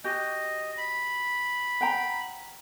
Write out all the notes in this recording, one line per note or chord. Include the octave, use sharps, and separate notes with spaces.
F#4 G4 D#5
B5
F#5 G5 A#5